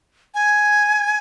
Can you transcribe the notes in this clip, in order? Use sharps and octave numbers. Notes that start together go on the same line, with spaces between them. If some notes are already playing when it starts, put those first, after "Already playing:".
G#5